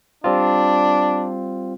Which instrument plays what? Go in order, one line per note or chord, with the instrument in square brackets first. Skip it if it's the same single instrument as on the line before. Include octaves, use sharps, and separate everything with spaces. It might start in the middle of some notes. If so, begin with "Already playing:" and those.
[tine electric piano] G3 C4 F4 [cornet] D4